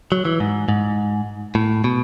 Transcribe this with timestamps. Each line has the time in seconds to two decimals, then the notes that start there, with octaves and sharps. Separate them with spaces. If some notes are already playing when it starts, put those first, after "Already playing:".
0.12 F#3
0.25 E3
0.40 G#2
0.69 G#2
1.55 A2
1.84 B2